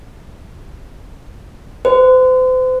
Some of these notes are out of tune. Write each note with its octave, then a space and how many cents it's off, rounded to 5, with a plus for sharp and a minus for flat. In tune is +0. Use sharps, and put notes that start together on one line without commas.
C5 -40